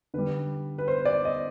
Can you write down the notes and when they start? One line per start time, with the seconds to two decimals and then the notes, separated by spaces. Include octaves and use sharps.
0.14 D3 G3 B4
0.78 B4
0.88 C5
1.05 D5
1.25 D#5